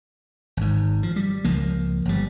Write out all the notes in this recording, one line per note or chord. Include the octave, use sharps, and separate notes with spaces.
G#1 G#2
F3
G3
C#2 F3 A#3
G1 G3